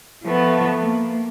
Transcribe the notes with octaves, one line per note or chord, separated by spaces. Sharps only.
F3 A3 B3
A#3